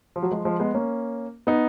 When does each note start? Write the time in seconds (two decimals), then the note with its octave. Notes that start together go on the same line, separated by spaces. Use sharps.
0.16 F3
0.23 F#3
0.31 F3 G#3
0.45 F3 G#3
0.60 G#3 B3
0.74 A#3 C#4
1.47 B3 D#4